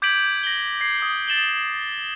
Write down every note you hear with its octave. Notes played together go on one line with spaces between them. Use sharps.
D6 G6 G#6 B6 D7 F#7
A#6 F#7 G7
G#6 C7
D#6
A6 E7 F#7 G7